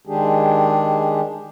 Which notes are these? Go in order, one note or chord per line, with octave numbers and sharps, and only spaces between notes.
D#3 G#3 D4 G4 G#4